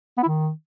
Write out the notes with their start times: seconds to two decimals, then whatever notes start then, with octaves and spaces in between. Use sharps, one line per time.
0.17 B3
0.23 E4
0.28 D#3